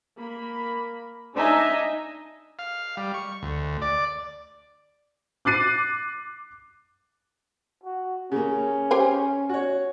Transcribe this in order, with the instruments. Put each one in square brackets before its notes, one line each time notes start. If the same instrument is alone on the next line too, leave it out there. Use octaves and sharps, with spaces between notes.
[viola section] A#3 B5
D4 D#4 D#5 E5 G#5 A#5
[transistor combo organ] F5
G3
C#6
D2
D5
[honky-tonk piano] D6 F#6 A6 C7 D#7
[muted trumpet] F#4
[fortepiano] C#3 A#3 [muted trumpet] C#4
[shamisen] G4 C5 G#5
[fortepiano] F#4 C#5